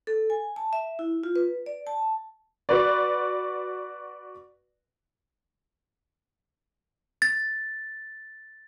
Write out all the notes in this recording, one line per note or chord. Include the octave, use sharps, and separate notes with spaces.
A4
G#5
A5
E5
E4
F4
B4
D5
A5
F#4 B4 D5
A6